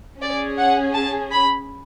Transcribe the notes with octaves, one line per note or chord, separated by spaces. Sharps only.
C#4 G#4 D5
F#5
A5
B5